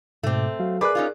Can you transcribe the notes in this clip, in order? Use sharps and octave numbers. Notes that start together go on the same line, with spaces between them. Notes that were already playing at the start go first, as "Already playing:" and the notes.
G#2 B2 A3 C4 D6
F#3 F#4 F5
G#4 A#4 B4 D5 D6 F#6
C#4 D#4 F4